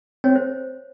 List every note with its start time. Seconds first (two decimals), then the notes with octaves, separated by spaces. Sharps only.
0.24 C4 C#5
0.36 C5